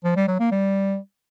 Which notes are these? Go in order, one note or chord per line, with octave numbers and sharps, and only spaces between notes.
F3
G3
F#3
A#3
G3